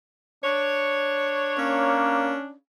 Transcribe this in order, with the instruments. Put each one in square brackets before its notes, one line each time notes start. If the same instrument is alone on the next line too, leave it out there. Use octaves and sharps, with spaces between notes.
[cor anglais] D4 [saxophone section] C#5
[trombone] A#3 [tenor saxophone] C#4